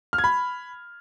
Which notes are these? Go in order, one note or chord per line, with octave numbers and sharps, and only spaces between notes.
F6
G#6
B5